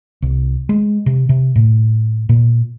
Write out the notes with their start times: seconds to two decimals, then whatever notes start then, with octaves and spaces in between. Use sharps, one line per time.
0.22 C2
0.69 G#3
1.06 C3
1.29 C3
1.56 A2
2.29 A#2